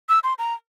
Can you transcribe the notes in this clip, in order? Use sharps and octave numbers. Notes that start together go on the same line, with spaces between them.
E6
C6
A#5